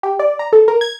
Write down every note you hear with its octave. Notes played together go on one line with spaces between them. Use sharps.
G4
D5
A#5
A4
A#4
G#6